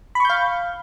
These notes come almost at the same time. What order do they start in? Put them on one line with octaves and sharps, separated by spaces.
B5 C#6 G6 F5